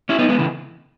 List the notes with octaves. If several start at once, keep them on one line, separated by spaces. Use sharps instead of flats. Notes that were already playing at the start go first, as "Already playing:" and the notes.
C#4 E4
B3 D#4
G#3 B3
C#3 E3